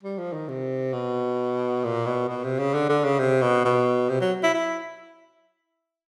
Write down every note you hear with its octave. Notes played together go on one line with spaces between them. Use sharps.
G3
F3
D#3
C3
B2
A#2
B2
B2
C3
C#3
D3
D3
C#3
C3
B2
B2
C3
F#3
E4
E4